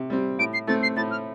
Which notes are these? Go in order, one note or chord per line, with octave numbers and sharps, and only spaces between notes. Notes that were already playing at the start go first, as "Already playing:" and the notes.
Already playing: C3
G3 C4
A2 D7
C7
A3 C4 A6
C7
A2 A6
F6